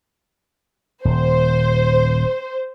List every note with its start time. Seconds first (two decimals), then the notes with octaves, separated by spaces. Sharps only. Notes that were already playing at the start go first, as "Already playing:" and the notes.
1.05 D#1 C5